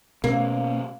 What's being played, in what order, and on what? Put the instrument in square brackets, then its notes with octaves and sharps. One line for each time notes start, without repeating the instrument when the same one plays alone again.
[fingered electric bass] B2 C#4 [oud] A#3